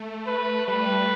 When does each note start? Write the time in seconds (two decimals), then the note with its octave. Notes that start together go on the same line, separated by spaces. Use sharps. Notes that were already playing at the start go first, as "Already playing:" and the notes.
Already playing: A3
0.26 A3 B4
0.67 G3 B4